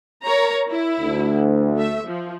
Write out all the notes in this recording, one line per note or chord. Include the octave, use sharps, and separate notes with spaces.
A#4 C#5 A#5
E4
D2
A3 E5
F3